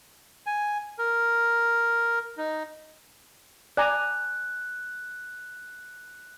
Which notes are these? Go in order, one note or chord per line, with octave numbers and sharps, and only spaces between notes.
G#5
A#4
D#4
D5 G#5 A#5 F#6